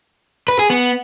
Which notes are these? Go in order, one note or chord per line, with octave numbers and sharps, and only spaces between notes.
B4
G#4
B3